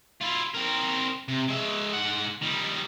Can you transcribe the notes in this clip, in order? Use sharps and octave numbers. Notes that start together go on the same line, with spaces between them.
E4 F4
C4 A#4
C3
G#3 E5
G#2 F#5
D#3 G3